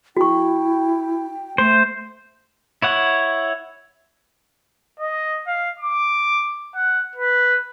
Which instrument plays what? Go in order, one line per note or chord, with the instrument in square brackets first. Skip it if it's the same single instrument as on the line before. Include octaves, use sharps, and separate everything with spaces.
[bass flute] E4 [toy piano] F#4 C#6 [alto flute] G5
[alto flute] A3 [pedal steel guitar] C5
[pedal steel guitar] E4 C#5 F#5
[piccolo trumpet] D#5
F5
D6
F#5
B4